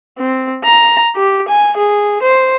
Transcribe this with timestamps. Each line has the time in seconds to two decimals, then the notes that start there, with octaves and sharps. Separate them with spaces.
0.19 C4
0.64 A#5
1.16 G4
1.48 G#5
1.77 G#4
2.23 C5